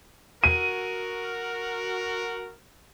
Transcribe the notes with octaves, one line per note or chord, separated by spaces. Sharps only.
F#4 A#4 D#7